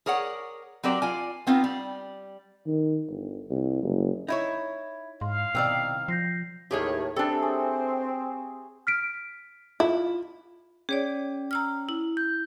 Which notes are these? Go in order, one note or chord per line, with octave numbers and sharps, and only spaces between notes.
G#4 A#4 C#5 D5 F#5
F#3 C4 G4 A#4 D5
F4 D5 G#5
B3 C4 D#4 F4
G3
D#3
G1
C2
F#1
D#4 E4 C#5 E5 B5 G#6
G#2 F5 C6
C2 B2 D#3 D5 G5 E6 F6
F3 G6 A#6 C7
D#2 A2 G4 G#4 C#5
G3 C4 D4 G#4 A4 E5
G#4 C5 C#5
F6 B6 D7
E4 F4
C#4 G#4 C#5 D5
A#5 E6 F6
E4
G6